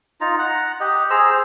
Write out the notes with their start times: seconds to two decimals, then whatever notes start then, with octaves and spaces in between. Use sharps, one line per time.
0.21 D#4 F4 A#5
0.39 F#5 A#5
0.80 G4 D#5
1.10 G#4 C5 A#5 E6